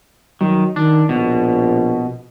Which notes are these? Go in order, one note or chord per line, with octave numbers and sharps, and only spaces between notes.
D#3 F#3
D#3 D4
A#1 B2